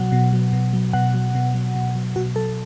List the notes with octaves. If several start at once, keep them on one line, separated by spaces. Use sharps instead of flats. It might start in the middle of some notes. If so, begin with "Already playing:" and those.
Already playing: B2 F#3 F#5
B2
F#3
B2
F#3
B2 F#5
F#3
B2
F#3
B2
F#3
B2 F#4
F#3 A4